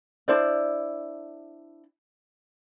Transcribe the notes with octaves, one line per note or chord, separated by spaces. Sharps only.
D4 E4 C5 D5